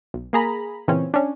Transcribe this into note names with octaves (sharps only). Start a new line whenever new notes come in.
B1
A#3 G#4 A#5 B5
A#2 C#3 E3 C4 C#4
C#4 D4